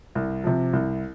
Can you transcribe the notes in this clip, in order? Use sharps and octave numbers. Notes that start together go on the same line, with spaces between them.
C2
C3 F3
C2